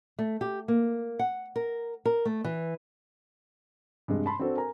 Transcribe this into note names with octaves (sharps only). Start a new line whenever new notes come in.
A3
G4
A#3
F#5
A#4
A#4
A3
E3
G2 C3 G#3
A5 B5 C6
C4 D4 F#4 A4 C5
A#4 G#5 A#5